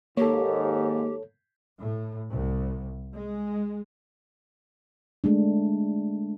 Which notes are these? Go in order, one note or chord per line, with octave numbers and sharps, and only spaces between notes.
D#2 G#2 A#3 G4 A4 C#5
A2
C2
G#3
G#3 A3 D4